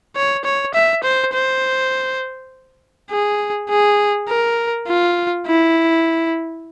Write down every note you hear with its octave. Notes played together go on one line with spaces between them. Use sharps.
C#5
C#5
E5
C5
C5
G#4
G#4
A#4
F4
E4